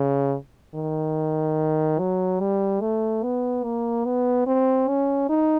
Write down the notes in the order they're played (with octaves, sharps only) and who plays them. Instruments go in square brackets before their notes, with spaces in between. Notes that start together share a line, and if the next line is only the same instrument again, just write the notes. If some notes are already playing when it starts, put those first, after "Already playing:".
Already playing: [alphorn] C#3
D#3
F#3
G3
A3
B3
A#3
B3
C4
C#4
D#4